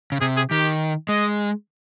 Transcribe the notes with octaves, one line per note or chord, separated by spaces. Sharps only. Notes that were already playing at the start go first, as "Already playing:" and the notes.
C#3
C3 G#4
G#4
D#3 G4
G#3 D#5